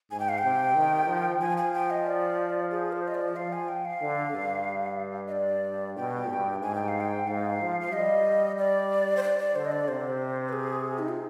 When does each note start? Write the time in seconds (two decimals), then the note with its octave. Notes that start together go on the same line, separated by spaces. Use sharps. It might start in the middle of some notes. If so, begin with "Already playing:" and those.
0.11 G#2 G#5
0.20 G5
0.29 F5
0.38 G5
0.44 C3
0.75 D#3
1.08 F3
1.40 F3 G#5
1.57 G#5
1.73 G5
1.90 D#5
2.06 D5
2.71 G#4
2.92 C5
3.08 D#5
3.15 D5
3.36 F3 F5
3.53 G#5
3.68 G5
3.85 F5
4.01 D3
4.34 G2
5.28 D#5
5.32 D5
5.97 B2 G5
6.30 G2
6.62 G#2 G#5
6.75 G5
6.88 F5
7.00 G5
7.27 G#2 F5
7.60 F3
7.81 F5
7.93 G3 D#5
8.58 D5
9.17 C5
9.23 D5
9.39 D5
9.55 D3 C5
9.65 D#5
9.71 D5
9.88 C3 C5
10.49 B4
10.53 G#4
10.99 D#4
11.09 F4